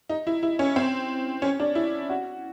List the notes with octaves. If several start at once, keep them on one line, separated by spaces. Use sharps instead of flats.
D#4
E4
E4
C#4
C4
C#4
D4
E4
F#4